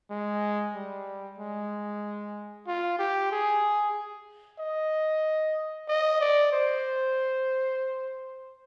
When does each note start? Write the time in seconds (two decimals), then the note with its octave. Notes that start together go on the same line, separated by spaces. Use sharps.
0.10 G#3
0.74 G3
1.39 G#3
2.67 F4
2.99 G4
3.31 G#4
4.59 D#5
5.88 D#5
6.20 D5
6.52 C5